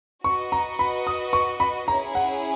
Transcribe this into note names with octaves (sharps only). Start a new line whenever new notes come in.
F#4 B4 D#5 C#6
A#5
B5
D#6
C#6
B5
C#4 E4 G#4 C#5 A#5
F#5